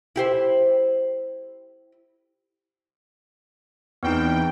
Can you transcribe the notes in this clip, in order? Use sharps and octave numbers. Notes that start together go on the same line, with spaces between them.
E4 G4 C5
E2 B3 C4 D#4 G5